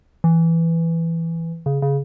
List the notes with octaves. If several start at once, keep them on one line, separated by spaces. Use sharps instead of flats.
E3
C#3
C#3